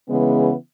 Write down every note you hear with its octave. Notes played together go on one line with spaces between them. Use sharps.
C#3 E3 G#3 B3